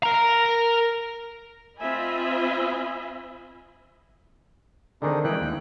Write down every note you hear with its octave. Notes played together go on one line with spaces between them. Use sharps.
A#4 A#5
C4 F4 D#5 E5 G#5 B5
D3 D#3 C4 D4 D#4 G#4
E3 G#3 G5 F#6
D#2